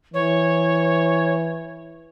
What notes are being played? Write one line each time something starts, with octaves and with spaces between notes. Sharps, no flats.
E3 C#5